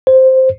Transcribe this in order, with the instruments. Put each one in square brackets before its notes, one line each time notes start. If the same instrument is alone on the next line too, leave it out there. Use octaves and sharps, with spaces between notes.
[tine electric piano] C5